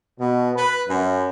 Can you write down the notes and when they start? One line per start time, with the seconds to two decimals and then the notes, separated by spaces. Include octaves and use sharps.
0.20 B2
0.56 B4
0.88 F#2